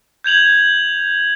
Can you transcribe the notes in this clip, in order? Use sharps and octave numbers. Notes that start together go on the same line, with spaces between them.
G6 G#6 F7 F#7